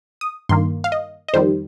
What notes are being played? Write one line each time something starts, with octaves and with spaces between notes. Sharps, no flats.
D#6
G2 D#3 A#3 C6
F5
D#5
D#5
F2 D#3 G3 C5